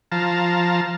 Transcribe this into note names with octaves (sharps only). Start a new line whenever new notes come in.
F3 F5 A5 A#5